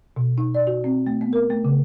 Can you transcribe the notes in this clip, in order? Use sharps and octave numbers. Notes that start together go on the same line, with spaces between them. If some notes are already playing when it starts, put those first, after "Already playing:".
B2
D#4
D5
F#4
C4
A3
B3
A#4
A3
C#3